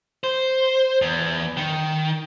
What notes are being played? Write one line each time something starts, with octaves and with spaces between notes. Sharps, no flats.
C5
E2
D#3